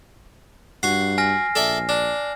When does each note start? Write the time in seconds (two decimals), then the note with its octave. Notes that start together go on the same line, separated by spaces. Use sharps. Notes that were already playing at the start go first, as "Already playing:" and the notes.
0.83 G2 F#4 F#5 C7
1.18 G#5 F6 A#6
1.55 A#1 A4 D5 E5
1.89 D4